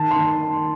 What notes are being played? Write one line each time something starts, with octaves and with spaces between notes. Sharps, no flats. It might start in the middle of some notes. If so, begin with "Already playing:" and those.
Already playing: D#3 A5
C6
D#3